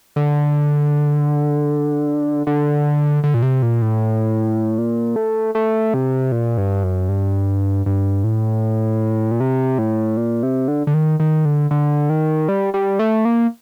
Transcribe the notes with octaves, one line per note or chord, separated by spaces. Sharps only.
D3
D3
D3
A#2
C3
A#2
A2
A#2
A3
A3
C3
A#2
G2
F#2
G2
G2
A2
A#2
C3
A2
A#2
C3
D3
D3
D#3
D#3
D3
D3
D#3
G3
G3
A3
A#3